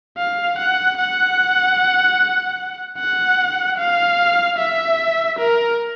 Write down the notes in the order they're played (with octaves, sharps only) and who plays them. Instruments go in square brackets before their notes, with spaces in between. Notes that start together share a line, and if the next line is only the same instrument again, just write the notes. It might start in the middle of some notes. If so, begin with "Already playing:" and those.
[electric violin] F5
F#5
F#5
F#5
F5
E5
A#4